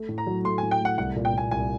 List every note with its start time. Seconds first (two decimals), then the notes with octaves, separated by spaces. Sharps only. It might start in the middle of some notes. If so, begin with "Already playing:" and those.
Already playing: A3
0.09 A2
0.18 A#5
0.27 F#3
0.44 A3 C6
0.58 G#5
0.63 A2
0.71 G5
0.81 A3 F#5
0.98 C2 F#5
1.16 A#2
1.25 G5
1.34 A#2 G#5
1.51 C2 G#5